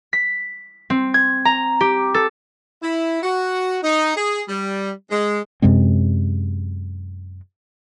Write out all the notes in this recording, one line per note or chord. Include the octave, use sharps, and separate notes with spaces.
B6
C4
G#6
A#5
G4
A4
E4
F#4
D#4
G#4
G3
G#3
F#2 C3 G#3 C4